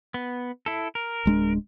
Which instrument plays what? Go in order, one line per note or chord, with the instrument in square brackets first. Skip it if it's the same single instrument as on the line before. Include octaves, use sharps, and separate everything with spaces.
[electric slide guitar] B3
E4 A4
A#4
[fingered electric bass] D1 G#3 D4